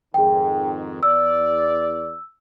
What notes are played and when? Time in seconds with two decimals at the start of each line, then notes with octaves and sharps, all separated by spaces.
0.14 F2 G#2 D#3 G#4 G5
1.03 E2 D5 E6